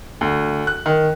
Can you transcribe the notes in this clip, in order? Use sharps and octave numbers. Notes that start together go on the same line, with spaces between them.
D2
F#6
D#3